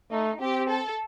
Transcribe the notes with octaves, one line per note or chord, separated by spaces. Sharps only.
A3 D#4
C4 G4
A4